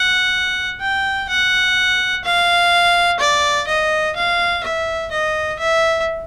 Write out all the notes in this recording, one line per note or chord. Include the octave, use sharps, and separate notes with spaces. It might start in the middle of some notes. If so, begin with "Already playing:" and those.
Already playing: F#5
G5
F#5
F5
D5
D#5
F5
E5
D#5
E5